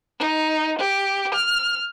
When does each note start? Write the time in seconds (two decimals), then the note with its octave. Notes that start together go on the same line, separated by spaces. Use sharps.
0.19 D#4
0.78 G4
1.35 F6